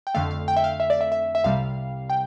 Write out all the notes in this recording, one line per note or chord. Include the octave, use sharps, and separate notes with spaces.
G5
F2 D3 A3 F5
F5
G5
E5
F5
E5
D5
E5
E5
E5
C2 C3 G3 F5
G5